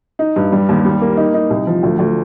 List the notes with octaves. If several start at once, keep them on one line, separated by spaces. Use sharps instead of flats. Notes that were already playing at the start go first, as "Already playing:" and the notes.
D#4
G2
G3
D#2
G3
A#3
D#4
D#4
C2
F3
D2
D2